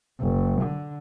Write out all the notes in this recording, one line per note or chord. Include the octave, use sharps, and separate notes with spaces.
F#1
D3